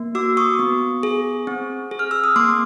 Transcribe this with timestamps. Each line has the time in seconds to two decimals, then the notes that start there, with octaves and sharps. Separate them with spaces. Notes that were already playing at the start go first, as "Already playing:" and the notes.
Already playing: A#3
0.15 F#4 D6 E6
0.37 C#6 D#6
0.59 B3
1.03 G#4
1.47 C4
1.91 G#4
1.99 F6
2.11 E6
2.24 D#6
2.36 A#3 C6 D6